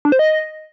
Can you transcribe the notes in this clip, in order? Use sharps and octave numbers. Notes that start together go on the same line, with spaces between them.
D4
C5
D#5